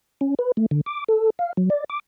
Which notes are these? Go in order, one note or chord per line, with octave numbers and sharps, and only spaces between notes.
C#4
B4
A3
D3
D6
A4
F5
F#3
D5
D6